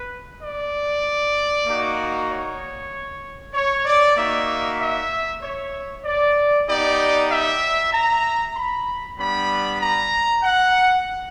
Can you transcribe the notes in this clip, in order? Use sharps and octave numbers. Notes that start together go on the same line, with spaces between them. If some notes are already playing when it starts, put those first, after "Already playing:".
Already playing: B4
D5
A#3 D#4 F#4
C#5
C#5
D5
A#3 D#4 F#4 E5
E5
C#5
D5
B3 D#4 G4 D5
E5
A#5
B5
G3 B3 D4 B5
A#5
F#5